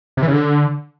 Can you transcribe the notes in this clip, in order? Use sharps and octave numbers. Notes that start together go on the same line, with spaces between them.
C3
E3
C#3
D3